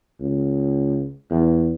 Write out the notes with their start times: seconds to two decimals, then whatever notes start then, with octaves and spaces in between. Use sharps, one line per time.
0.20 C#2
1.30 E2